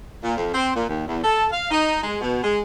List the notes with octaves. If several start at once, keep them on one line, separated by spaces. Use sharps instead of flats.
A#2
F2
C4
A#2
D#2
E2
A4
F5
D#4
G#3
B2
G#3